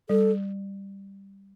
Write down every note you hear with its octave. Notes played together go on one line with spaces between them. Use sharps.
G3 A4